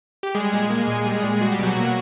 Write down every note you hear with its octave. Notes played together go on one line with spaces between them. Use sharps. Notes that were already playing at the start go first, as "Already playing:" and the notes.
G4
G3 G#3 G#4
A#2
A#3
A#2
G3
A#2
G3 F#4
G4
B2 F#3 F#4
A#3